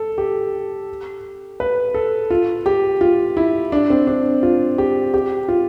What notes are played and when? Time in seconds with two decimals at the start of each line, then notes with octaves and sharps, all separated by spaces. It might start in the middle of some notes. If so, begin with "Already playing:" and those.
Already playing: A4
0.18 G4
1.60 B4
1.94 A4
2.30 F4
2.66 G4
3.01 F4
3.37 E4
3.72 D4
3.90 C4
4.07 D4
4.43 F4
4.78 G4
5.14 G4
5.48 F4